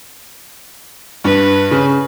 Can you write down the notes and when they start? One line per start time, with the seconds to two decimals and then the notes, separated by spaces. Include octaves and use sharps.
1.24 G2 B4
1.71 C#3